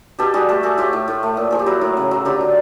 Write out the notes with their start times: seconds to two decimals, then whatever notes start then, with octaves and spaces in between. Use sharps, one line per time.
0.19 B2 G4 A4
0.34 G3 F#4 G#4
0.49 A3 G4 A4
0.63 A3 F#4 G#4
0.78 A2 F4 G4
0.93 A2
1.08 A2
1.23 A3
1.37 A#2
1.51 F3 G#4
1.59 G4
1.66 F#3 E4 F#4
1.81 A2
1.97 C#3
2.11 F#3
2.25 D3 F4 G4
2.41 D3